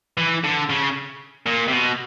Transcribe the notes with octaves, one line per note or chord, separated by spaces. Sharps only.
E3
D3
C#3
A#2
C3
B2